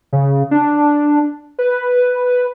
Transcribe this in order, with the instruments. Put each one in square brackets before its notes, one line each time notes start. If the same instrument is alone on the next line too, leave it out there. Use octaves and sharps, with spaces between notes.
[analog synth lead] C#3
D4
B4